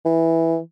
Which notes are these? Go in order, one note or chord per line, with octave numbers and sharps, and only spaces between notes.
E3